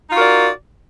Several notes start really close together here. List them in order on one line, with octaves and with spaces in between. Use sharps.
D#4 F4 F#4 A#4 D5